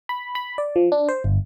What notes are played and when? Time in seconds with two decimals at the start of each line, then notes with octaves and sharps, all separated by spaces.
0.09 B5
0.35 B5
0.58 D5
0.76 F3
0.92 D4
1.09 C5
1.24 G1